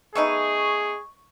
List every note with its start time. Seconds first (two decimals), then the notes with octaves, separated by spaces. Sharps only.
0.15 A3 B3 D#4 G#4 C#6